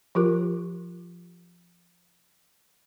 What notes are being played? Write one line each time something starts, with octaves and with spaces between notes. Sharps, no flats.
F3 F4 G4 A#4